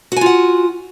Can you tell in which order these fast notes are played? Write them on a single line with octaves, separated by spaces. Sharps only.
F#4 G#5 F4 F#5